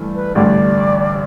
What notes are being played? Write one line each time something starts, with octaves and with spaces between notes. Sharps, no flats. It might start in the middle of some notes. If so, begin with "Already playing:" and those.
Already playing: G2 E3 A3
B4
A1 G2 D3 D5